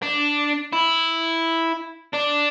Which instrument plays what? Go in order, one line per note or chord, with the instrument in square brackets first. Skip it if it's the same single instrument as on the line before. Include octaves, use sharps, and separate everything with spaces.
[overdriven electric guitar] D4
E4
D4